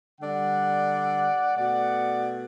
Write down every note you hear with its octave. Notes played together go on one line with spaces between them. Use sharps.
D3 G3 D5 F#5
B2 A3 D5 F#5